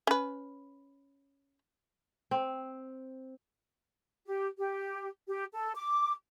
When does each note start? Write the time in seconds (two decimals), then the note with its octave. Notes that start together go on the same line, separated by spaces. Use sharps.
0.07 C#4 B4
2.31 C4
4.26 G4
4.58 G4
5.27 G4
5.54 A4
5.75 D6